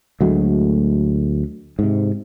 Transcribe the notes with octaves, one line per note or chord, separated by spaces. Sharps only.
D2 F#3 G#3 A3
G#2 C3